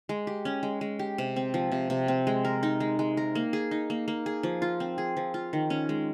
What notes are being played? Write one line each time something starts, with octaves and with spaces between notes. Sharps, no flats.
G#3
G4
C#4
G#3
G#3
G4
C3
C4
F3
C3
C3
C4
G#3
A#4
D#4
G#3
G#3
A#4
A#3
G#4
D#4
A#3
A#3
G#4
F3
F4
C4
G#4
F3
F4
D#3
C#4
G#3